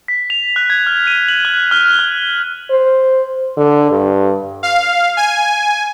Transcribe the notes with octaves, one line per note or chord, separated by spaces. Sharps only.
B6
F7
F#6
G#6
F6
D#7
F#7
F#6
F6
F#6
C5
D3
G2
F5
G#5